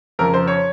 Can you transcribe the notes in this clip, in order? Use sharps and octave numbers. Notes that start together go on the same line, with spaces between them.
F2 C#3 F3 A#4
C5
C#5